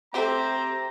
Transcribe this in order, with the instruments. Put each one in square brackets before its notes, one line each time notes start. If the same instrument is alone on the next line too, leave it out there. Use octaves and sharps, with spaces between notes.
[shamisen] A3 F#4 [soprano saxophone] C4 [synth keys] G4 C5 E5 [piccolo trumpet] A#5